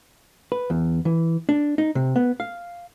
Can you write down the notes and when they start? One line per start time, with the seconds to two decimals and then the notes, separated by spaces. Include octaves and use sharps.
0.52 B4
0.70 E2
1.05 E3
1.49 D4
1.78 D#4
1.95 C3
2.16 B3
2.40 F5